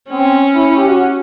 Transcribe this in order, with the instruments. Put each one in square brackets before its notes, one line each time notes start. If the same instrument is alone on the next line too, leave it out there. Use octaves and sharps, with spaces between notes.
[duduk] C4 [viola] C#4
[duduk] E4
E4
G4
F#4